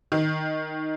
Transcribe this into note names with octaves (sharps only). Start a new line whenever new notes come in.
D#3